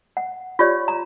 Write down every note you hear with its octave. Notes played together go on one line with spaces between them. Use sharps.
F#5
F4 G4 C#5 D5
A#5